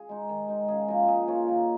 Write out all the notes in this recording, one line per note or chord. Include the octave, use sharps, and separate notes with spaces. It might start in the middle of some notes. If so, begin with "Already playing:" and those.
Already playing: G#4
G#3 D#4
D#3
G#3 D#4
C#3 G#4
F3 A#3 D#4 A#4
A#2 G#4
A#3 F4 C#5
D#3 A#4